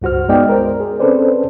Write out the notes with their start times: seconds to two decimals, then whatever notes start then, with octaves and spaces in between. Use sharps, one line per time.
0.02 C#2 G2 F#4 C5 F6
0.29 G#3 B3 D#4 D5 D#5 G5
0.49 A#4 C5
0.80 G#4
1.00 C4 C#4 A4 B4 C5 D5